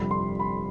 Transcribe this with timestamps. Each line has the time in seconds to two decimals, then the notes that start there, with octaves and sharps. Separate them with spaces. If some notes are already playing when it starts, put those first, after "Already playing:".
Already playing: G1 F2 C3 G3 B5
0.11 C6
0.40 B5